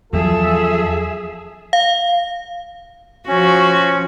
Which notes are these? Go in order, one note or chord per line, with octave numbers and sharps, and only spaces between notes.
E2 F3 F#3 F4 G#4 A4 E5
F5
F3 C#4 F#4